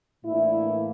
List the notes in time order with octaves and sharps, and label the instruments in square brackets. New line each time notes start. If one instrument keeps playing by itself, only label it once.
[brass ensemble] A2 E3 A#3 D4 E4